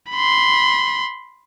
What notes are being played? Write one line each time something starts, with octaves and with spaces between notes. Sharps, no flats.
B5 C6